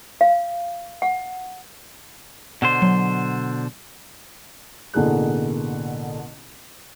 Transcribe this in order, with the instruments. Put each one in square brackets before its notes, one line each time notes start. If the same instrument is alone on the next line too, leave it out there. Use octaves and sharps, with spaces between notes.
[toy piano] F5
F#5
[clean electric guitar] B2 D3 C5
[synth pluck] F#3
[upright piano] A1 B2 D3 A#3 G#4 F#6